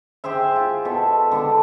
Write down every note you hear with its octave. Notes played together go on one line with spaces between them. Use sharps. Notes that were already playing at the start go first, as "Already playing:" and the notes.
G4 G#4 C5 E5
F4
B2 A4 E5
D3 B3 D4